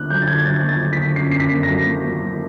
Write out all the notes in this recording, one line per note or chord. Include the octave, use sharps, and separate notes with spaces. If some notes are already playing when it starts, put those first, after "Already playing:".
Already playing: D3 A#3 F#6
F#3 G6
A6
D3 G#6
F#3 A6
A#3
A6
A#3
B6
D3
F#2 C7
F#2 C7
B6
A#3
A#6
F#3
A#3
A#3
F#3